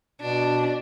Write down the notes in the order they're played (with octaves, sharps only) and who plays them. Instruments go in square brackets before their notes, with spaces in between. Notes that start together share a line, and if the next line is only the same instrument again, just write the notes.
[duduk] B2 [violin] D4